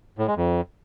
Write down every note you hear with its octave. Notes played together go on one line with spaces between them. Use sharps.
A2
G#3
F2